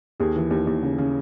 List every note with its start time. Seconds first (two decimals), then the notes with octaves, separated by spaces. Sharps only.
0.20 D#2 G#4
0.36 E3
0.51 D#2
0.67 D#2
0.83 C#3
0.98 C#3